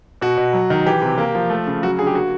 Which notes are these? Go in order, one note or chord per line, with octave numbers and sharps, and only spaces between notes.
B2 F#4
B2
F#3
D#3
E3 G4
C3
A#3
F3
A3
C#3
F#3 F#4
D3 G#4
G4
A#3 F#4